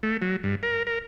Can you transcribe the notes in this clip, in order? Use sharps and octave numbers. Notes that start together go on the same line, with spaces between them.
A3
F#3
G2
A#4
A#4